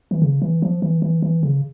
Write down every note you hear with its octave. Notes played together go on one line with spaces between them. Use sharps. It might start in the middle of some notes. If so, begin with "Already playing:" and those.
E3
C#3
E3
F3
E3
E3
E3
C#3